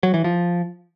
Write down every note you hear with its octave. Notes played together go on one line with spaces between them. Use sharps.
F#3
E3
F3